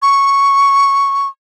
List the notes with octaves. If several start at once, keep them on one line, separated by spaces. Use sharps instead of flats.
C#6